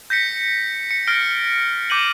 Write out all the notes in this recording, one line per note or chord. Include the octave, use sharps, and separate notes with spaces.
G6 A#6 B6 C#7
C#7
F6 A6 A#6 C7 D7 G7
D6 G6 D#7 F#7